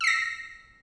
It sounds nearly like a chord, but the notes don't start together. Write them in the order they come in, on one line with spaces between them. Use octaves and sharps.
E6 C7 A#6